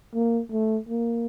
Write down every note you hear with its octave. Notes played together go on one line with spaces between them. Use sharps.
A#3
A3
A#3